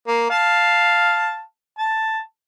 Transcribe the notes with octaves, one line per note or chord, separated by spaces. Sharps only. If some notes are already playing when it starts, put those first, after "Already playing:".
A#3
F5 A5
A5